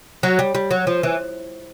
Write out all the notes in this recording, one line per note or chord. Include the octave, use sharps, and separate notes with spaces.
F#3
G3
G3
F#3
F3
E3